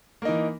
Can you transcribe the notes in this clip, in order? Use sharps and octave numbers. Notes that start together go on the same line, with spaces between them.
E3 A#3 D#4